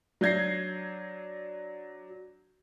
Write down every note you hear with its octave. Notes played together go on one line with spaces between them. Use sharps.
F#3 D4 G6 G#6 A#6 C7